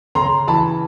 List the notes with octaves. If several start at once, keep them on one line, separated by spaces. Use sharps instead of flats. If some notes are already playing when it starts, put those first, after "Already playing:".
C#3 A#5 C6
E3 A5 B5